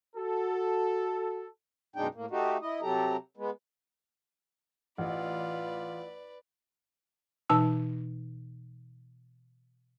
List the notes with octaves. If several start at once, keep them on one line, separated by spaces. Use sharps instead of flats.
F#4 A4
F#2 B2 G#3 D4 D#4 G5
A2 A#3
A3 D#4 F#4 G4
E4 D#5
C3 F#3 G4 A4 A#5
G#3 B3
A1 F4 B4 D5
B2 E3 D#4 A5 E6